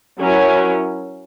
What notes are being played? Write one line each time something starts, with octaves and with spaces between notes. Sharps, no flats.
F#3 C#4 E4 A#4